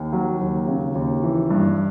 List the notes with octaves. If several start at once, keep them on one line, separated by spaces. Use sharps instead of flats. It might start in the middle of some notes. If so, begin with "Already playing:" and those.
Already playing: D#2
F#3
D#2
C#3
D#2
E3
G2